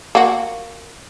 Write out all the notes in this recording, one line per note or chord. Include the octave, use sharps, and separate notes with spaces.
A#3 F#4